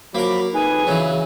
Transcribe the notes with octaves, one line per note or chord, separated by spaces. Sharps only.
F3 F#3 A#3 A#4 B5 D6
F2 D#4 G#4 B4 G#5
C#3 E3 F#3